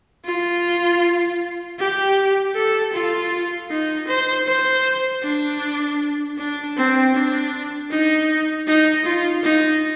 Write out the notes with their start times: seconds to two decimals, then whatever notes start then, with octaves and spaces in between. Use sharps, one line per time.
0.25 F4
1.79 G4
2.55 A4
2.93 F4
3.70 D#4
4.07 C5
4.46 C5
5.23 D4
6.38 D4
6.76 C4
7.14 D4
7.90 D#4
8.67 D#4
9.05 F4
9.44 D#4